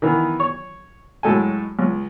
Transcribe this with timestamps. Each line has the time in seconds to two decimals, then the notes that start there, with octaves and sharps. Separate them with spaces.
0.02 D#3 E3 B3
0.40 C#5
1.23 A2 F#3 G#3 A4 G5 G#5
1.79 C#2